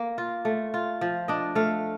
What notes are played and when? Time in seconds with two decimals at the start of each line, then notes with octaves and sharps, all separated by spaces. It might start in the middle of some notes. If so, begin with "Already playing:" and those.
Already playing: A#3
0.18 F4
0.45 A3
0.74 F4
1.01 F3
1.28 D4 D#5
1.55 A3 F5